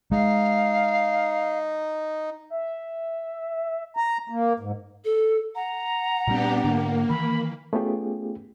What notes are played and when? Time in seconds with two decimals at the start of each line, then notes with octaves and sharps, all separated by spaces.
0.11 G#3 D#4 F5
2.50 E5
3.97 A#5
4.30 A#3
4.60 G#2
5.05 A4
5.55 F#5 A#5
6.27 A#2 G3 B3 C4 D4 G4
6.64 G#2 D3 A#3 D4
7.09 D#3 E3 B5
7.73 A3 B3 C#4 F4 G4 G#4